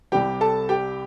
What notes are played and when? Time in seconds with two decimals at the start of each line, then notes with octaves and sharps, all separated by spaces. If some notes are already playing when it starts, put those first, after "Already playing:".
0.12 C2 C3 G3 G4 G5
0.41 A4 A5
0.69 G4 G5